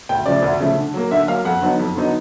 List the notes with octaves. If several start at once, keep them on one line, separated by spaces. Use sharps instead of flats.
D2 G5
C#3 F3 A3 D5
D2
C#3 F3 A3
D3
F#3 A#3
D3 E5
F#3 A#3 F5
F2 F#5
D3 F#3 B3 D#4
F2
D3 F#3 B3 D#4